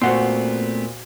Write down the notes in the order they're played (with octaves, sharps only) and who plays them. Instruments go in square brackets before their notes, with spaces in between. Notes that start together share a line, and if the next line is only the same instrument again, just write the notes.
[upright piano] A#2 C5 [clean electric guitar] A3 B3 C4 [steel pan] F#4 F#5 C6